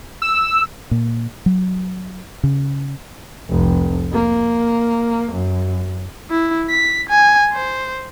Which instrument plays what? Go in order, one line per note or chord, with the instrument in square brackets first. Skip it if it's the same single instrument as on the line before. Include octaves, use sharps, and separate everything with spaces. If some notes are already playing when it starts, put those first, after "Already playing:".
[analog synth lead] E6
[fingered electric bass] A#2
F#3
C#3
[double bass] F1 C2
A#3
F#2
[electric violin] E4
B6
G#5
C5